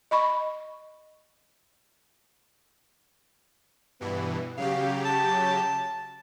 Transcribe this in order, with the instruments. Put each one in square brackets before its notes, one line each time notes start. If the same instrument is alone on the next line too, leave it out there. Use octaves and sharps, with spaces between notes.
[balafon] D#5 B5 C#6
[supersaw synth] G2 B2 E3 [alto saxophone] B3
[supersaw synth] C#3 F#3 G4 [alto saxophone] F5
[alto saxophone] A5